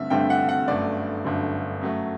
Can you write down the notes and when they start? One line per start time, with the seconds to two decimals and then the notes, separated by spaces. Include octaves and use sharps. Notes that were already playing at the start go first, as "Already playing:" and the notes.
Already playing: G2 D3 A3 C4 E5
0.10 G2 D3 A3 C4 G5
0.30 F#5
0.49 F#5
0.68 G1 F#2 D3 A3 D5
1.25 G1 F#2 D3 A3
1.81 F#2 F#3 A3